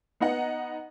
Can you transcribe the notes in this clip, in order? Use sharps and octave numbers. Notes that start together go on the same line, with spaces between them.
B3 D#4 D#5 F#5